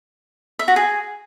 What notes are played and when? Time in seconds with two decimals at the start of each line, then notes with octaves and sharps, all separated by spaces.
0.59 E5
0.68 F#4
0.76 G#4